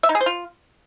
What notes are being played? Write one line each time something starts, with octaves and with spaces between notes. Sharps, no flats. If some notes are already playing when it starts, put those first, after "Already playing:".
E5
D#4
G#4
C5
F4